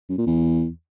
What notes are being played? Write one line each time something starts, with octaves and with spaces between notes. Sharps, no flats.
F#2
A#2
E2